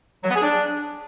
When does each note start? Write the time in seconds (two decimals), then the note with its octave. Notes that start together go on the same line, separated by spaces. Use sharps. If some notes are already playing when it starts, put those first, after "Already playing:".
0.24 F#3
0.30 B3
0.36 G#4
0.42 D4